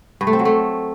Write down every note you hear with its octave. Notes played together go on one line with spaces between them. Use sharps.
G2
A3
C4
F#3
A3